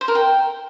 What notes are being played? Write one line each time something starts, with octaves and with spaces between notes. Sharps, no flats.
C5
A#4
G5